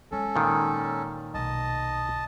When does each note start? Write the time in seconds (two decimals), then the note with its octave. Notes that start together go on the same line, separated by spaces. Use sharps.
0.12 G#3 C#4 A4
0.36 A#2 D#3
1.34 B1 D#5 A5